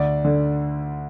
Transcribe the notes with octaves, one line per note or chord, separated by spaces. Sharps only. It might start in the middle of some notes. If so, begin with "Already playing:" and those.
Already playing: D2 D5
D3